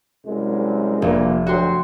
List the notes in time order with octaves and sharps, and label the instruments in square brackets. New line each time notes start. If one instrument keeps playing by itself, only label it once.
[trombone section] C2 F#2 G#3
[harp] F1 [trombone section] G2 A#2 A#3
[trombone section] D2 F#3 G4 [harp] F#4 C6